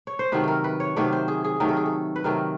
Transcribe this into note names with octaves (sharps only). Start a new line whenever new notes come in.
C#5
C5
C3 D#3 F#3 A3 B4
A4 A#4
B4
C#5
C3 D#3 F#3 A3 D5
C5
G#4
G#4
C3 D#3 F#3 A3 A#4
A4
G#4
A4
B4
C3 D#3 F#3 A3 A#4